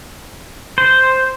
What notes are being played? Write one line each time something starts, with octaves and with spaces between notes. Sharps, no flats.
C5